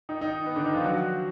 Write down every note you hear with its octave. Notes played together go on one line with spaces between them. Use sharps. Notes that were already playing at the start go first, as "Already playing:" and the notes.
D#3 D#4
D#3 D#4
B3
D3 D4
D#3 D#4
F3 F4
F#3 F#4